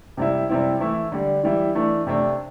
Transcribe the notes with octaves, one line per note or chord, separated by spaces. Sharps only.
C3 G3 E4
C3 G3 C4 E4
E3 A3 E4
D3 G3 D4
E3 G3 E4
E3 A3 D4
C3 A3 D4